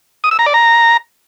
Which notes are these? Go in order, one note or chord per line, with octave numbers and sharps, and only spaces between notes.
D#6
E6
A#5
D5
A#5